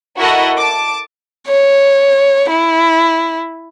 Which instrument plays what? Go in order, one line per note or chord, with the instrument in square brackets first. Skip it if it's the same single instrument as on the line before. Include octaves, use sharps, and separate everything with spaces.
[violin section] E4 F#4 A4 A#4 D#5 F#5
A5 D6
[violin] C#5
E4